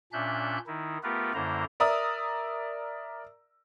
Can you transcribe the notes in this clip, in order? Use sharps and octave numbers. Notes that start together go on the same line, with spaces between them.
A#2 C#4 D4 E5 F#6 G6
D#3 D#4 E4
A3 B3 F4 G4 A#4 B4
F#2 D3 A#3 E4 C5 A#5
A#4 D5 E5 A#5 D#6 E6